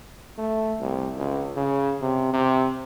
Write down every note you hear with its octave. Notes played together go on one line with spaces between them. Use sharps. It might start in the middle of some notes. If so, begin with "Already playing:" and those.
A3
C2
C#2
C#3
C3
C3